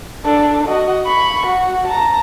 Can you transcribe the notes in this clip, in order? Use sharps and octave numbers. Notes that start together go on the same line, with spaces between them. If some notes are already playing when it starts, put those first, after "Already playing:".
D4 A4
F#4 D#5
B5 C#6
F#4
A5 A#5